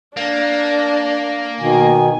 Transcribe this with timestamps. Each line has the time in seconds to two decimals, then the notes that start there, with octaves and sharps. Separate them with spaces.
0.17 A#3 D4
1.61 B2 D#3 G#5